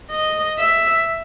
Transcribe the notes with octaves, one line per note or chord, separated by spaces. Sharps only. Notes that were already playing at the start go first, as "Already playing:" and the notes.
D#5
E5